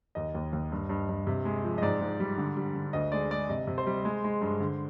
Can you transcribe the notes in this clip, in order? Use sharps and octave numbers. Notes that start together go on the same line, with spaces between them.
D#2 D#5
D#2
D#2
G2
G2
G2
C3
G#3
F3
D#5
G#2 D5
G#2
G3
D3
G3
D3
D2 D#5
G#3 D5
G#3 D5
C3 D#5
C3
C5
G3
G#3
G#3
G2
D3